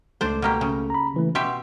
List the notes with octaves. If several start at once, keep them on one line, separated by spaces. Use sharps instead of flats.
C#2 A3 D4 A4 C5
B2 A#3 G4
C#3
A#5 B5
C#3 E3 A3
B2 G4 E5 F#5 C6